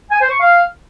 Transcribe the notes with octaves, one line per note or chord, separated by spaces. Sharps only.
G#5
C5
C#6
F5